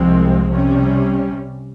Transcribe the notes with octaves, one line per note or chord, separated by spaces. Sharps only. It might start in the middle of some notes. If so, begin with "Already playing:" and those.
Already playing: C2 C3 F3 G#3 C4
C3 G3 C#4